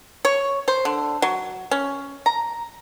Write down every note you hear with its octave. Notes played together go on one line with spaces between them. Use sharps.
C#5
C5
D3
F#3
C#4
A#5